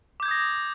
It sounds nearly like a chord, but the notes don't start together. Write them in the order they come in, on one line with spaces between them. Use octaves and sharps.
D6 G6 G#6 D#6 A#6